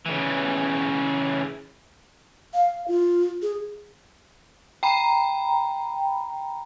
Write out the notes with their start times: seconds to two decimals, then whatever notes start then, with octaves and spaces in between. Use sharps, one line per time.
0.06 C#3 E3
2.54 F5
2.88 F4
3.42 G#4
4.83 G5 A#5 B5